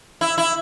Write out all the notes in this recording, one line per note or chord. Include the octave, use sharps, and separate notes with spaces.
E4
E4